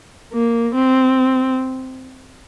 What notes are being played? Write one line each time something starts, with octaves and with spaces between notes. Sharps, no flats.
A#3
C4